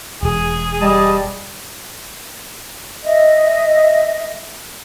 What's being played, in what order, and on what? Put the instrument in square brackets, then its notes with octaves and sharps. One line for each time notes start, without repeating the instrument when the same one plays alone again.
[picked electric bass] E1 [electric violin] G#4
[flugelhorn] G3 [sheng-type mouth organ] D#5 A5
[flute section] D#5 E5